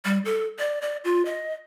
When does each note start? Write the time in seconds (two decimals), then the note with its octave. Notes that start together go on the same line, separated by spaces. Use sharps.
0.05 G3
0.25 A4
0.59 D5
0.82 D5
1.04 F4
1.25 D#5